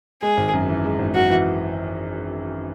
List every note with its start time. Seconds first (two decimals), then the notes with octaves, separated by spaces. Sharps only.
0.22 G#3 G#4
0.37 G#1
0.53 F#2
0.68 E3
0.84 G#3
0.99 G#1
1.15 F#2 F#4
1.30 E3